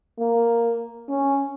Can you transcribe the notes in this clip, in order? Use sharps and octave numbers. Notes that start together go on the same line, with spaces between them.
A#3
C#4